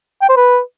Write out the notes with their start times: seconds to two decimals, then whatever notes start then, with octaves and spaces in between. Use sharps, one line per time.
0.22 G5
0.29 C5
0.36 B4